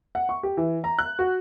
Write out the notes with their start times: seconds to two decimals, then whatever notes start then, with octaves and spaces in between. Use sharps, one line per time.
0.15 F#5
0.29 C#6
0.43 G4
0.57 E3
0.84 A#5
0.99 F#6
1.19 F#4